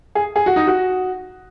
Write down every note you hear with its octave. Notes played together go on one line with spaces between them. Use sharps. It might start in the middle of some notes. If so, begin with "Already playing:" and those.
G#4
G#4
F#4
D#4
F#4